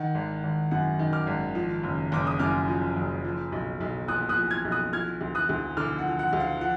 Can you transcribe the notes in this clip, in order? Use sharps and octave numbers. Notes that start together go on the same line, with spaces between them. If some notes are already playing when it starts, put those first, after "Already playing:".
Already playing: D#3 F#5
G#1
G#1
F#2 F#5
D#3
D6 F6
G#1
F3
F#1
F#1 D6
D#6
F#2 D6 F6
F3
F#1
F3
B1
B1
A#2 D#6 F#6
D#6 F#6
F3
F6 G#6
B1
D#6 F#6
F3 F6 G#6
D2
D#6 F#6
D2
D3 D6 F6
F#5
F3
F#5
D2
F5
F3 F#5